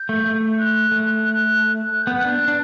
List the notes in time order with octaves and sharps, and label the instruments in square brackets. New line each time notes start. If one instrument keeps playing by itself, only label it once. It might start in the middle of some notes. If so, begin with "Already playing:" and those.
Already playing: [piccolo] G6
[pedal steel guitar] A3
A3
[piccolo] F#6
[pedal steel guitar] A3
[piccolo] F#6
F#6
[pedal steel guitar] B3 [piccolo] G6
[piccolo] F#6
[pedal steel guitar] D4
D4